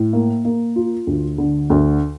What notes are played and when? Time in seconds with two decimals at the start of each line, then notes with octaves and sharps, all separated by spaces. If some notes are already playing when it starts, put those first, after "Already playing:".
Already playing: A2
0.13 A#3
0.45 A#3
0.76 F4
1.07 D2
1.38 D3
1.70 D2